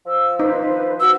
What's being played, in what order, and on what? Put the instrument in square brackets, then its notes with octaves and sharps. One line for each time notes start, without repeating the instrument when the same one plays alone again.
[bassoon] F3 [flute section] E6
[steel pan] D#4 [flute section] B4 C5
[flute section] F#4 [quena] E6